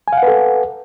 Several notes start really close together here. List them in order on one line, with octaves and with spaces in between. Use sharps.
G#5 F5 F#5 B4 A4